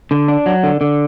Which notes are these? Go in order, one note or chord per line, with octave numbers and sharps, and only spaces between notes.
D3
D4
F#3
D3
D3